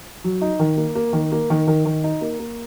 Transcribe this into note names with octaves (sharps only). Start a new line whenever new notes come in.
F#3
D#4
D#3
A#3
A#3
D#3
A#3
D#3
D#3
D#3
D#4
A#3
A#3